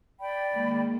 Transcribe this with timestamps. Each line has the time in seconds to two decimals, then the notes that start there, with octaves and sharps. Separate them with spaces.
0.20 D5 G5 B5
0.53 D#3 G#3 A#3